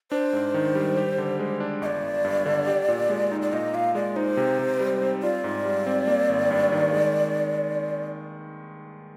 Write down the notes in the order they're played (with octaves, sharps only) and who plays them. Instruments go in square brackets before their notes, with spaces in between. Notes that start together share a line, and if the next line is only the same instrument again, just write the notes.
[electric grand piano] D4 [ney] C5
[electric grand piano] G#2
D#3
G3
G4
D3
G#3
D4
[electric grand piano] G1 [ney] D#5
[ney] D5
[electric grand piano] G1
G2
D3
G4
A#2
G#3
D#4
[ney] D5
[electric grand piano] A#2 [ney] D#5
[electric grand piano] A#2 [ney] F5
[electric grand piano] G#3 [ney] D5
[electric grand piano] D#4 [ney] C5
[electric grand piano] C3
C3
G3
C4
[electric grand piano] F4 [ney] D5
[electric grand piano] G#2
G3
C4
A#3
G#1
G2
D#3
G#3